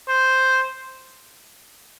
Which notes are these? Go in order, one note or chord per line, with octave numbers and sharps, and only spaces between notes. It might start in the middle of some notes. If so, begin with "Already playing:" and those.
C5